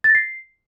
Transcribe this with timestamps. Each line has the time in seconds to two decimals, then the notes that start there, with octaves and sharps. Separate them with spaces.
0.04 A6
0.10 A#6
0.15 C7